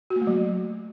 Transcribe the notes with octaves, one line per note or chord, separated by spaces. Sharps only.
F#4
A#3
A3
F#3